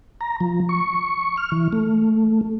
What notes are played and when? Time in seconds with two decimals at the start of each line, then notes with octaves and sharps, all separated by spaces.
0.21 A#5
0.40 F3
0.69 C#6
1.37 F6
1.52 E3
1.73 A3